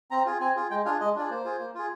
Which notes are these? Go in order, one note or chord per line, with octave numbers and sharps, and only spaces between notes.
C4 A#5
F4 G#4
C4 G#5
F4 G#4
G#3 G5
D4 F4 G#4 F5
G#3 D#5
D4 F4 G#4 D5
A#3 C5
F4 G#4
A#3
F4 G#4